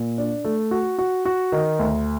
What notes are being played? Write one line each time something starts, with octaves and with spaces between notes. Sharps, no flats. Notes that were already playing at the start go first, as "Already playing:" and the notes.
Already playing: A#2
D4
A3
F#4
F#4
F#4
D#3
D2